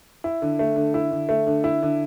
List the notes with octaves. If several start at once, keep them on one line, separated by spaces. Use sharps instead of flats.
E4
D3
A3
D3
E4
D3
A3
D3
E4
D3